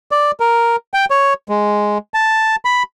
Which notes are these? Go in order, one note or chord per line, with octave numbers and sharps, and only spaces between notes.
D5
A#4
G5
C#5
G#3
A5
B5